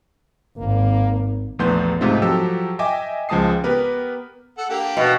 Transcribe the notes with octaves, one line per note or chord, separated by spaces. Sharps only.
G#1 A#3
A#1 E2 A3 B3 C6 G6
G#2 C3 A3 C4 D#4 F4
F3 F#3 G4 A4 E6
D#5 E5 G5 G#5 D6
C#2 F3 G#3 A5 D#6 C7
B3 G4 A#4 B4
A4 F#5
A#3 D4 G4
B2